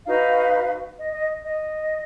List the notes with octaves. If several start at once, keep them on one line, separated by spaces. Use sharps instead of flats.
D#4 F#4 B4 F5
D#5
D#5
D#5